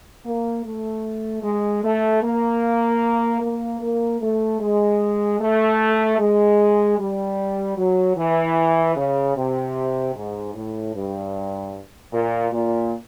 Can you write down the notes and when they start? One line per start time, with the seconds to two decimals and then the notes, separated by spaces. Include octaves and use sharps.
0.25 A#3
0.64 A3
1.43 G#3
1.83 A3
2.23 A#3
3.41 A#3
3.81 A#3
4.21 A3
4.60 G#3
5.40 A3
6.19 G#3
6.98 G3
7.77 F#3
8.16 E3
8.96 C#3
9.36 C3
10.15 G#2
10.54 A2
10.94 G2
12.13 A#2
12.52 A#2